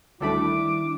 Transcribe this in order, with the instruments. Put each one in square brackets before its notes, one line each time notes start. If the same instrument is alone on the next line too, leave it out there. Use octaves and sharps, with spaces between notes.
[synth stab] D2 A3 B5 [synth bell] D#3 G3 D4 [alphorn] E4 [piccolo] D6